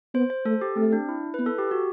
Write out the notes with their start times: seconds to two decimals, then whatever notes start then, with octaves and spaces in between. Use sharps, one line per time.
0.14 B3 C5
0.30 C5
0.45 A3 A4
0.61 G4
0.76 A3 C4
0.93 D4
1.09 E4
1.34 B3 B4
1.46 A4
1.58 G4
1.71 F#4